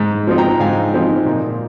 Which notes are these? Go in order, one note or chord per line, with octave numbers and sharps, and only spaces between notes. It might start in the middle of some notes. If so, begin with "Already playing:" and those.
Already playing: G#2
F3 C4 D#4
G5 A#5
G#2 F5 G#5
F3 C4 D#4
A#2